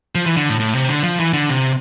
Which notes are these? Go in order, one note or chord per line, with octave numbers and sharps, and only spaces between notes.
F3
E3
D3
A2
A2
C3
D3
F3
E3
D3
C3